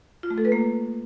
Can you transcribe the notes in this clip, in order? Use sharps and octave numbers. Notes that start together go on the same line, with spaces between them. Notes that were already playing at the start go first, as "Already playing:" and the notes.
F4
A3
A4
B4
A#3